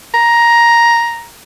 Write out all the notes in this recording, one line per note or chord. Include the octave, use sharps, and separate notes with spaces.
A#5